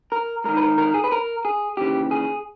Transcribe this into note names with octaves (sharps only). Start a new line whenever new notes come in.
A#4
G#2 D#3 A#4
B4
A#4
A#4
G#4
B4
A#4
G#4
D#2 C#3 E3 G4
G#4